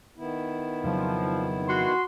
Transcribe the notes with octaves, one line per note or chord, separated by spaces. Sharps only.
D#3 B3 E4
F2 C#3 F3 F#3
F#4 C6